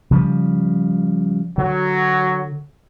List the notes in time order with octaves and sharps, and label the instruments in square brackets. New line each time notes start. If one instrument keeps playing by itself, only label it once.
[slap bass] C#3 F3 G3
[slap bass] D3 [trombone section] F#3